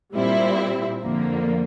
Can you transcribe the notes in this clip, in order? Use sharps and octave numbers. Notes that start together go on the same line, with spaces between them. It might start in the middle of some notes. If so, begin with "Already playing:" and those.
A#2 G3 C4 E4
F2 D3 F3 A#3